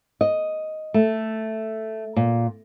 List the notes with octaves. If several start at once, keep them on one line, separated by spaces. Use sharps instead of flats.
D#5
A3
A#2